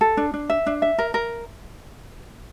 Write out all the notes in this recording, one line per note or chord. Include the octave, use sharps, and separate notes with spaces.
A4
D4
D4
E5
D4
E5
A#4
A#4